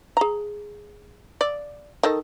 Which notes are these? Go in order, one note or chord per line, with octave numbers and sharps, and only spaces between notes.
G#4 A#5
D5
D#3 A4 D#5